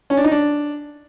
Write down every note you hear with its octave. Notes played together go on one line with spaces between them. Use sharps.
C#4
D4
D#4
D4